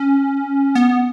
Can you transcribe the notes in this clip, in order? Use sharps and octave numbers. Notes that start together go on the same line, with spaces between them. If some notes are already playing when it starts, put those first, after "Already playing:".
Already playing: C#4
B3